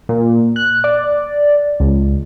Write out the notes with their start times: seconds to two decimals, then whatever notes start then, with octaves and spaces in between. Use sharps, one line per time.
0.09 A#2
0.56 F#6
0.84 D5
1.80 C#2